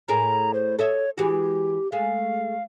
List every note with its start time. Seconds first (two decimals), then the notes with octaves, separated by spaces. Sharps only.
0.08 A2 G#4 A#4 A#5
0.54 C5
0.79 A4 C#5 D#5 E5
1.18 E3 G#3 F#4 G4
1.92 G#3 A3 F5